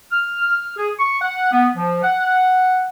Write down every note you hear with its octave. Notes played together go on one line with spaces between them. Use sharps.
F6
G#4
C#6
F#5
B3
F3
F#5